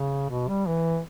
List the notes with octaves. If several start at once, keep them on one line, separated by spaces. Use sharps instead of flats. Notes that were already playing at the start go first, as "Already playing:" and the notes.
Already playing: C#3
B2
G3
E3